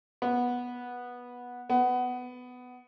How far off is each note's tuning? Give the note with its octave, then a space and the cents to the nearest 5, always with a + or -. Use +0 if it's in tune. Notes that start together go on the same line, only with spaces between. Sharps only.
B3 -10
B3 +15